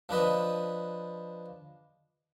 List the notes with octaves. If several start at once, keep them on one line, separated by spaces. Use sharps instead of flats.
F3 D4 B4 D#5